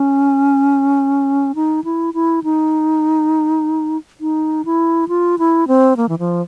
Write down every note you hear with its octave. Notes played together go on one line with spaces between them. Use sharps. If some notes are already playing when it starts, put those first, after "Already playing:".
Already playing: C#4
D#4
E4
E4
D#4
D#4
E4
F4
E4
C4
A#3
E3
F3